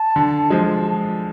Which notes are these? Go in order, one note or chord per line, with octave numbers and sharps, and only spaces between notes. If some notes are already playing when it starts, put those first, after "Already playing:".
Already playing: A5
D3
F3 G#3